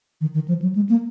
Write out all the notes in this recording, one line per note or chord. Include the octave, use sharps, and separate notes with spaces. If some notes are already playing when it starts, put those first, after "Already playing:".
D#3
D#3
F3
F#3
G#3
A#3